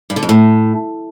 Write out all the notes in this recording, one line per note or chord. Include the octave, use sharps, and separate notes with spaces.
G2
D3
F2
A2